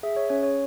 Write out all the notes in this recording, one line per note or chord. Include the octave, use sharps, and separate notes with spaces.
G#4 E5
C#5
C#4 C#5
C#5